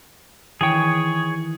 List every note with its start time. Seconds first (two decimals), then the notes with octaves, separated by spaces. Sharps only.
0.61 D#3 E3 G#4 C#5 G5